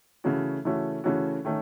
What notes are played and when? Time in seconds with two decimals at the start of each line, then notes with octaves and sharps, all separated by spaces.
0.24 C#3 E3 A3 C#4 F#4
0.65 C#3 E3 A3 C#4 F#4
1.04 C#3 E3 A3 C#4 F#4
1.45 D#3 A3 C#4